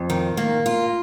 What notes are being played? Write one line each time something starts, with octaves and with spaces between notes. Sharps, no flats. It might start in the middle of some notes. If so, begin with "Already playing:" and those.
Already playing: F2
D#3
A#3
F4